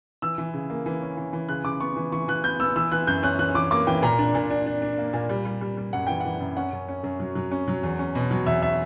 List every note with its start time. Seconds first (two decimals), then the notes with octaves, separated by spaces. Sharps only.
0.22 E3 E6
0.38 E3
0.54 C#3
0.70 A#3
0.86 E3
1.02 C#4
1.17 E3
1.33 E3
1.49 C#3 F#6
1.65 C#3 D6
1.80 B3 C#6
1.96 E3
2.12 E3 C#6
2.28 E3 F#6
2.44 B3 G6
2.60 B3 E6
2.76 E3 E6
2.92 E3 F#6
3.07 F#2 G6
3.23 C#4 F#6
3.39 E3 F#6
3.55 E3 D6
3.71 A#3 D6
3.87 E3 G5
4.02 A#2 A#5
4.19 D4
4.35 A#2
4.50 D4
4.66 D4
4.82 D4
4.98 A#3
5.13 A#2
5.29 G3
5.45 G3
5.61 G3
5.77 G3
5.93 F#2 F#5
6.07 E3 G5
6.21 E3 F#5
6.40 F#2
6.57 C#4 F#5
6.73 F#2
6.88 C#4
7.04 F#2
7.20 F#3
7.35 F#3
7.51 C#4
7.68 F#3
7.83 E2
7.99 C#4
8.15 B2
8.31 F#3
8.46 E2 E5
8.62 E5